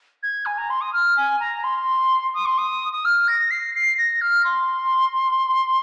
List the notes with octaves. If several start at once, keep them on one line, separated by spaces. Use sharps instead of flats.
G#6
G#5
A#5
C6
D#6
F6
G#5
A#5
C6
D#6
C6
D#6
D#6
F6
A#6
C7
C7
A#6
F6
C6